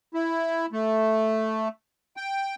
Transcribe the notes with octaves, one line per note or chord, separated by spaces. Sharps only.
E4
A3
G5